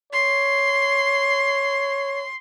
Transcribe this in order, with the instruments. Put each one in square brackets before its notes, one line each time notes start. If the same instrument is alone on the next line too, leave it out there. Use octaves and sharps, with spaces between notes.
[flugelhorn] C#5 [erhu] C6